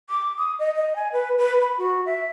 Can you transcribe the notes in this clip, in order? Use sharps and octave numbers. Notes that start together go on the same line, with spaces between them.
D6
D#6
D#5
D#5
G#5
B4
B4
B5
F#4
E5